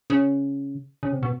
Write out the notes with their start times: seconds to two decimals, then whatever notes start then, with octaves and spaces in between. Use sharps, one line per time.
0.10 C#3
1.03 C#3
1.12 C3
1.23 B2